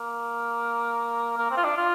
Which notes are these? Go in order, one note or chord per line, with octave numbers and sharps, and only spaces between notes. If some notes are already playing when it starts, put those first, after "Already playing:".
Already playing: A#3
A#3
C4
F4
D4
F4